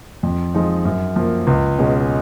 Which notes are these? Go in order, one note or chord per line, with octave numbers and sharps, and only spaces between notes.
F2
F3 G#3 D#4
F#2
F3 A#3
C#2
B2 G#3 C#4